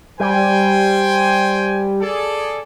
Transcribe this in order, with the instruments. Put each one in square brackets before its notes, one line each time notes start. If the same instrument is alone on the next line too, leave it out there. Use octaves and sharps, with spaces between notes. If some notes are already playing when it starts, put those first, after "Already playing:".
[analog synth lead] G3 [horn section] C5 G5 G#5
[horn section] G#4 A4 D5